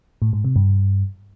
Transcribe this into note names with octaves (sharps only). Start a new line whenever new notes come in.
A2
G#2
C3
G2